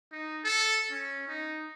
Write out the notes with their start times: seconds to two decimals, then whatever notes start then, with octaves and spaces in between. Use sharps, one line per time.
0.12 D#4
0.44 A4
0.91 C#4
1.28 D#4